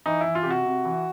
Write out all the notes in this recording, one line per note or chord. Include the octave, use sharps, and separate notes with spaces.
E3 D#4
E3 E4
F4
C3 G4
F#4
C3
E3